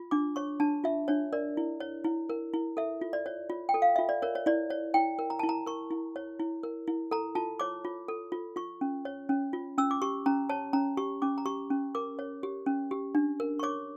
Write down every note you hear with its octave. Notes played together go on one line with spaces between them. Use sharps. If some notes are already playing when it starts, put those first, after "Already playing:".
Already playing: F4
D4 D6
C#5 C#6
D4 A5
F4 E5
D4 C#5
A#4 D5
E4
C#5
E4
A#4
E4
A4 E5
F4
D5
C#5
F4
G5
A4
F5
F4 E5
D5
A#4 C#5
C#5
E4 D5
C#5
E4 G5
A#4
A#5
E4 A5
A#5
A#4 C#6
E4
C#5
E4
A#4
E4
A4 A#5
F4 A5
C#5 D6
F4
A4
F4
F4 C#6
C#4
C#5
C#4
F4
C#4 E6
D6
G4 C#6
C#4 A#5
C#5 A5
C#4 A#5
G4 C#6
C#4 D6
A#5
G4 C#6
C#4
A#4 D6
C#5
G4
C#4
G4
D4
A#4
C#6
C#5 D6